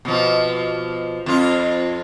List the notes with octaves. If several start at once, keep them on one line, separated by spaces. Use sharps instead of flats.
B2 F3
F2 F4